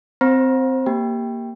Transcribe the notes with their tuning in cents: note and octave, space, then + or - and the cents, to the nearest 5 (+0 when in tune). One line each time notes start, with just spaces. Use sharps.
C4 -15 C5 +15 A#5 +45
A#3 +0 G4 +0 G5 +10